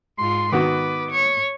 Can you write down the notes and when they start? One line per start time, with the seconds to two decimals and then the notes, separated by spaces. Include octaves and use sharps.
0.18 G#2 F4 C6
0.52 D#3 B3 F#4 B4 D6
1.11 C#5